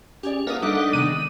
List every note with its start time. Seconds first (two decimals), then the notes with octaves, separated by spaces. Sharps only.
0.23 C#4 G4 G#4 D5
0.47 A#3 F4 A#4 B4 E5 F#5 A5 D#6
0.63 G3 D4 D#4 A4 E5 F#5
0.93 C3 D#3 G#3 B3 D#7